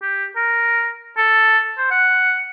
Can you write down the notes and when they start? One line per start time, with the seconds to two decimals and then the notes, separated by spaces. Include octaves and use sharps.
0.02 G4
0.36 A#4
1.17 A4
1.78 C5
1.91 F#5